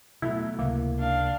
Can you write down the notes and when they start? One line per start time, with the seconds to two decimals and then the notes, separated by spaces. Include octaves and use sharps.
0.22 B2 F#3 A3 E4
0.59 C#2 C3 A#3
0.99 D4 F5